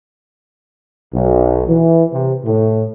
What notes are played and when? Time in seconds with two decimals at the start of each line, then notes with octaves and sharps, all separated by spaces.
1.14 B1
1.68 E3
2.12 C3
2.45 A2